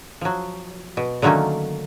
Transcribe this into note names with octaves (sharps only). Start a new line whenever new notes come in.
F3 F#3
B2
D3 D#3 F#3 A3 A#3 C#4